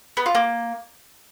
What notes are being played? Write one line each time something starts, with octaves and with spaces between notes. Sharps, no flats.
B3
F4
A#3